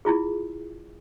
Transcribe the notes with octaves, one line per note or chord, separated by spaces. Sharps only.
E4 F4 G#4